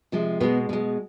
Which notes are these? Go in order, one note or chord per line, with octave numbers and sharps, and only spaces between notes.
C3 F3 G#3
B2 G#3 B3
B2 G#3